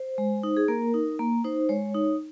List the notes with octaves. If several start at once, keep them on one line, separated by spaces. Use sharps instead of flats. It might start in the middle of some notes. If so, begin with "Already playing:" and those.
Already playing: C5
G#3
D#4
G#4
A#3 A#4
D#4
A#3
D#4 C5
G#3 C#5
D#4